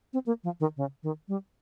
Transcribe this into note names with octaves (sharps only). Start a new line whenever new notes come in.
C4
A#3
F3
D#3
C#3
D#3
G3